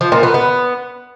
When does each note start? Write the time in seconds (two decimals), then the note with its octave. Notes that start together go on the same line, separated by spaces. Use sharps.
0.01 F3
0.12 A#2
0.23 B3
0.34 B3